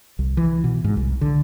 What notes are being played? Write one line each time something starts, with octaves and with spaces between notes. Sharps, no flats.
C2
E3
B2
G#2
C2
D3